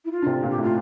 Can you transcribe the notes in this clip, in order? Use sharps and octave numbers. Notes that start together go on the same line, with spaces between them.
E4
F4
D3
C3
A#2
G4
A2 F4